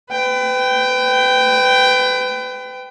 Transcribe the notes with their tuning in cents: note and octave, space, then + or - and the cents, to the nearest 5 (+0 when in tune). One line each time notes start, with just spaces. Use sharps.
B4 +35 G5 +0